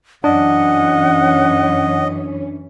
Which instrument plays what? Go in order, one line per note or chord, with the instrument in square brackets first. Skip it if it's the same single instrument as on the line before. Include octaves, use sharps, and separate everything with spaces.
[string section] F#2 E3 C#4 [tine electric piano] D4 [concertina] D#5 [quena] F#5